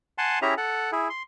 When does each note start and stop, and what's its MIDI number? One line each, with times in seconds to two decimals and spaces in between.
0.18 0.39 78
0.18 0.39 80
0.18 0.39 81
0.18 0.39 84
0.42 0.54 61
0.42 0.54 64
0.42 0.54 67
0.42 0.54 68
0.42 0.54 76
0.42 0.54 82
0.57 0.91 69
0.57 0.91 78
0.92 1.08 64
0.92 1.08 68
1.10 1.23 84